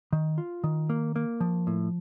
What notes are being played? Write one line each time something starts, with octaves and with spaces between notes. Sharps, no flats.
D#3
F4
D#3
A#3
A#3
F3
A2